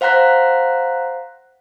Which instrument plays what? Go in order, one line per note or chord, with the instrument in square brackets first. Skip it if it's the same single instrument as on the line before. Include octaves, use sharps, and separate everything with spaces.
[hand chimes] C5 F5 F#5 A#5 F#6 B6